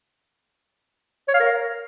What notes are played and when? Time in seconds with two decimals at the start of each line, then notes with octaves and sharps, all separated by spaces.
1.28 C#5
1.34 F5
1.40 A#4